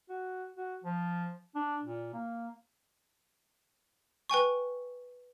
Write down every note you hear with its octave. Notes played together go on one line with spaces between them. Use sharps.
F#4
F#4
F3
D4
A#2
A#3
B4 G5 G#5 C#6